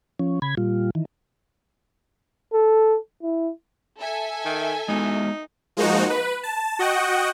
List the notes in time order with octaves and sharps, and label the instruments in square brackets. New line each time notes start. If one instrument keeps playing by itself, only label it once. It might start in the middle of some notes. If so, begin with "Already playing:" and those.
[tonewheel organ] F3 C#4
C#3 B5 G#6
A#2 G3 F4
D#3 E3
[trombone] A4
E4
[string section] A4 E5 G#5
[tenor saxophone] D#3
[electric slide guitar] G#3 B3 F#4 [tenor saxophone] D#4
[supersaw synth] F3 G#3 A#3 D#4 F#4
B4
A5
F#4 D#5 F#5 G5